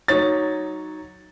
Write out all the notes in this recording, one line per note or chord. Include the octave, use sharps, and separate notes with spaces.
F#3 D#4 C#5 A6